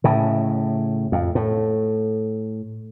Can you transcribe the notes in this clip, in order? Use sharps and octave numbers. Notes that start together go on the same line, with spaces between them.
A2 C#3
F2
A2